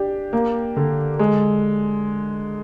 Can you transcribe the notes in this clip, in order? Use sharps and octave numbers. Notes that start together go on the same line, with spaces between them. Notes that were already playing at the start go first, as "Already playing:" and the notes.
Already playing: D4 G4
A#3
D3
G#3